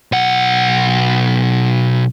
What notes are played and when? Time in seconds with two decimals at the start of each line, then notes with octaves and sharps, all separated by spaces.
0.12 B1 F#5